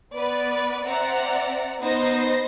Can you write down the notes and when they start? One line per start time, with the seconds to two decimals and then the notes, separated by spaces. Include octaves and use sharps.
0.14 B3 B4 D5
0.86 C4 D5 E5 F#5 A#5
1.80 B3 D#4 C5 A#6